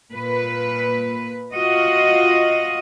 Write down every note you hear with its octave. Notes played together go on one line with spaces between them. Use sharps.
A#2 B4
F4 F#4 D#5